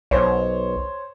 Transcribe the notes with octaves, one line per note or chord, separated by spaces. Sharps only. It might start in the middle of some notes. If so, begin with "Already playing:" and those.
B1 C5 C#5